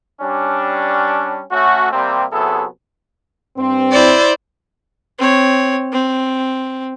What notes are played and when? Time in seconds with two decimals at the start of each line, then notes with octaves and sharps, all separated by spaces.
0.21 G3 C#4 D4
1.51 A3 C#4 F#4
1.92 C3 G3 A#3 C4
2.33 C3 F#3 B3 E4 G#4 A4
3.57 G2 C4
3.90 E4 C5 D5
5.18 C4 C#5
5.92 C4